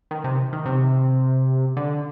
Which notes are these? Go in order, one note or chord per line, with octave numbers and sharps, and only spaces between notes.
D#3
C3
D#3
C3
D3